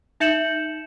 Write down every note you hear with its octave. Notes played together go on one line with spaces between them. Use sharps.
D#4 E5 G6 C#7 E7 F#7